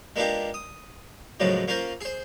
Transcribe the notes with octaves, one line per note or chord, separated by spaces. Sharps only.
G#3 A#3 B3 D4 F4 G4
D#6
F#2 A2 C#3 F3 F#3 G#3
A#3 C#4 F4 A#4 C5
G#4 C5